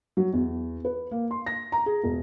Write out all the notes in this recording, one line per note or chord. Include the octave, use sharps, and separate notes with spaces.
F#3
E2
B4
A#3
C6
A#6
A#5
G#4
E1